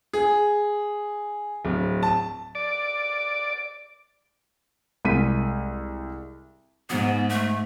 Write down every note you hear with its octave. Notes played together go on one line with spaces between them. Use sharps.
G#4
D1
A5
D5
C2 G#3 B6 D#7
G#2 B3
A3